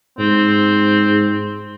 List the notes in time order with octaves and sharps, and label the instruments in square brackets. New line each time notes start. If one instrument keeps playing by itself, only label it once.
[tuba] G#2 [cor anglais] C4